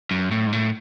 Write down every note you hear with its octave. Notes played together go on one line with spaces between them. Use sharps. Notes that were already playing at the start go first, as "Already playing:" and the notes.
F#2
A2
G#2
A2